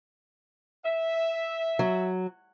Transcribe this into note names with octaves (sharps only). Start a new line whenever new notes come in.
E5
F#3